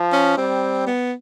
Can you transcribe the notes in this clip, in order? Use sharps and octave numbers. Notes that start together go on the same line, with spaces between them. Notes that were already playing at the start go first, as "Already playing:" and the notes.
Already playing: F3
C#4
G3 C4
B3